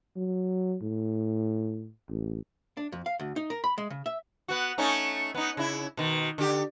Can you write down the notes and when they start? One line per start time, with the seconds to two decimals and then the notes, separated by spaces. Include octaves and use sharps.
0.16 F#3
0.82 A2
2.09 A1
2.77 D4
2.92 F2
3.06 F5
3.20 D2
3.36 D#4
3.50 A#4
3.64 B5
3.78 G#3
3.90 C#3
4.06 E5
4.48 B3 F#4
4.78 A3 C#4 D#4
5.34 B3 D#4
5.57 C#3 E4
5.97 B2 D#3
6.38 D3 G4